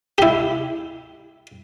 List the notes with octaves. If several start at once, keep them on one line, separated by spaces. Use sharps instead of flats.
E4 G4